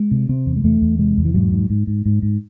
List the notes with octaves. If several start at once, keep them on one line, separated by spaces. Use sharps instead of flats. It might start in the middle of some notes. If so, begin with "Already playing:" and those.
Already playing: G#3
C3
C3 C4
E2
G#3
E2 A3
E2
C3 G#3
E2
E3
G#2 F#3
G#2
G#2
G#2
G#2
G#2